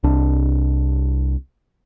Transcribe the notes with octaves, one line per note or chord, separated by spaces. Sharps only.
C2 D4